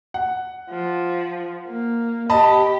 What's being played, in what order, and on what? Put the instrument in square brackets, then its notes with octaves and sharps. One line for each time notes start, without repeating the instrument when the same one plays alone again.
[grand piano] F#5
[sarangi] F3
A#3
[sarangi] G4 [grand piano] D#5 A5 B5